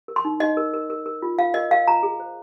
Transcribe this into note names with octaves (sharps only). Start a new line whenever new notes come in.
A#4
C6
D#4
D#4 D#5
A#4
A#4
A#4
A#4
F4
F4 F5
A#4 D#5
A#4 F5
F4 A#5
G#4
C5